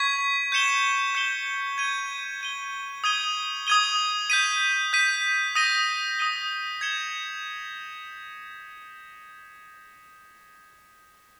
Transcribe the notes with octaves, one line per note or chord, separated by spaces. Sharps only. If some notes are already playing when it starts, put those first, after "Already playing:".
Already playing: C#6 G#6 B6
G6 C#7 E7 G7
G6 C#7 E7 G7
G#6 D#7 G7
G#6 D#7 G7
D#6 G#6 D#7 G7
D#6 G#6 D#7 G7
G6 B6 D#7
G6 B6 D#7
D#6 A#6 D#7 G7
D#6 A#6 D#7 G7
G#6 C#7 E7 G7